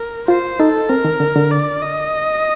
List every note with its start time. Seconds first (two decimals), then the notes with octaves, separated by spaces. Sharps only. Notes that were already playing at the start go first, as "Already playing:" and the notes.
Already playing: A#4
0.28 F4 C5
0.60 D#4 A4
0.89 C4 A#4
1.05 D#3
1.20 D3
1.36 D3
1.51 D5
1.82 D#5